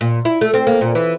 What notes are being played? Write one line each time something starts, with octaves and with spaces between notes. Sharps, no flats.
A#2
E4
A3
C4
A#3
A#2
E3